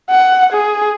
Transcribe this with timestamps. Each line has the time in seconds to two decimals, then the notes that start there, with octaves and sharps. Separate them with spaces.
0.10 F#5
0.52 G#4